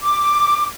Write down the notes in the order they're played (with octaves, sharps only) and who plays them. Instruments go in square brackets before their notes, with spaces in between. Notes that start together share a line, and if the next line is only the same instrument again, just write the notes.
[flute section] D6